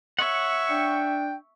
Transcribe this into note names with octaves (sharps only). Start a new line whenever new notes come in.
C#5 E5 F#5 C#6
D4 G5